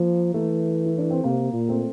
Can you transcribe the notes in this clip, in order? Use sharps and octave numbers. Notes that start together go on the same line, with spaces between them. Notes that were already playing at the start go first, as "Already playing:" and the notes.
Already playing: F3 A#3
E3 A3
E4
D4
C4
C3 A#3
A#2
A3 C4